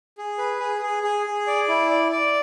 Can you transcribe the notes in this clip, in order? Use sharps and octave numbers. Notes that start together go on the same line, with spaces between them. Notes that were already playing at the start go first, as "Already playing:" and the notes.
G#4
B4
G#4
G#4
G#4
G#4
D5
E4
D5
D5